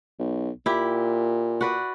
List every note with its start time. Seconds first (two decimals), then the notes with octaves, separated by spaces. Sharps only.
0.19 B1
0.66 A#2 E4 G4
1.61 F#4 B4 D5